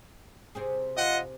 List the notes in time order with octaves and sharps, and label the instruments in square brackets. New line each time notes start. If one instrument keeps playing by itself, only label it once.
[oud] C3 C4 G#4
[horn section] F4 D#5 F#5